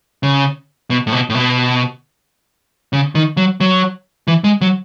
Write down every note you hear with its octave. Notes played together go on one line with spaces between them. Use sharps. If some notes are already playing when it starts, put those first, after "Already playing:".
C#3
B2
A2
B2
A2
B2
C#3
D#3
F#3
F#3
E3
G#3
F#3